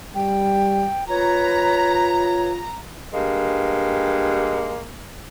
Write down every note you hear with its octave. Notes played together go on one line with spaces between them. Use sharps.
G3 G5
F4 B4 C#5 A#5
G2 G#3 A#3